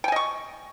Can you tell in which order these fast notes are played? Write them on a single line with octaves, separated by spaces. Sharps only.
G5 G#5 D#5 C#6